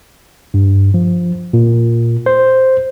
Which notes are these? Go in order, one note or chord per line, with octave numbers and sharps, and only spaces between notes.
G2
F3
A#2
C5